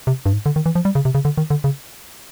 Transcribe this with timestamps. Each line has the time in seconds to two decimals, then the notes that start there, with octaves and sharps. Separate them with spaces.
0.07 C3
0.26 G2
0.33 G#2
0.46 D3
0.56 D#3
0.66 E3
0.75 F3
0.85 G3
0.95 C#3
1.05 C3
1.15 C#3
1.25 D3
1.37 D#3
1.50 D3
1.64 C#3